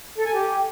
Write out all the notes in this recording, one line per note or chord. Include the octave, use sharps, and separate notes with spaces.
A4
G#5
G4